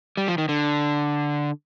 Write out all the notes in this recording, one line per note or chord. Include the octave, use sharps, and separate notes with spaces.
G3
F3
D#3
D3